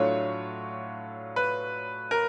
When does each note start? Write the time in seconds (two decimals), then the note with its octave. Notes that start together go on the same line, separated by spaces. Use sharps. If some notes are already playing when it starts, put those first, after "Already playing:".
Already playing: A2 F#3 A3 D4 F4 C#5
1.36 B4
2.11 A#4